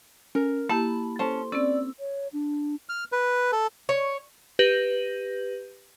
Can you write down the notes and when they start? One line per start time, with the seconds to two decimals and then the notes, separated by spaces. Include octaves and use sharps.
0.35 C#4 A#4
0.69 A#3 E4 G4 A5 B5
1.19 C#4 A4 C5 A5 C6
1.52 C4 C#4 D5 E6
1.99 C#5
2.33 D4
2.89 F6
3.12 B4
3.52 A4
3.89 C#5
4.59 G4 B4 G6 A#6 D#7 F#7